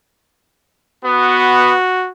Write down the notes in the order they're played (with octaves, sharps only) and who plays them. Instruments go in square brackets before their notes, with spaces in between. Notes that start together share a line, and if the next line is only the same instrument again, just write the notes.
[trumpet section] B3 [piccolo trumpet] F#4